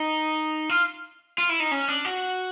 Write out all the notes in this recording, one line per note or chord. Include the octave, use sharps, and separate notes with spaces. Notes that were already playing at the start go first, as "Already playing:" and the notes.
Already playing: D#4
F4
F4
E4
D#4
C#4
D4
F#4